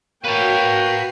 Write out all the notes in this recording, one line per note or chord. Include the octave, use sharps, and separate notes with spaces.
A#3 F#4 B4 C#5 G5 A5 C7